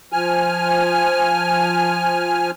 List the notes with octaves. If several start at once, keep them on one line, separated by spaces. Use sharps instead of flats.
F3 G#5 F6